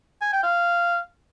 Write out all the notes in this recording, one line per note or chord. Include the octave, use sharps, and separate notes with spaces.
G#5
G5
F5